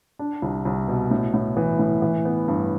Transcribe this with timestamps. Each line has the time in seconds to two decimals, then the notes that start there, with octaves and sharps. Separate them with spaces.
0.19 D4
0.42 C2
0.65 C2
0.88 B2
1.11 A2
1.34 A2
1.57 E3
1.79 A2
2.02 E3
2.25 B3
2.48 G2